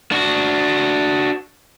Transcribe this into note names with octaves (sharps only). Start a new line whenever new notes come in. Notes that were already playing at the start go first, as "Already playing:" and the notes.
D4 F#4